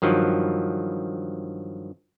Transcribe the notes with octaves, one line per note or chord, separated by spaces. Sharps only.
G2 D#3 F3 F#3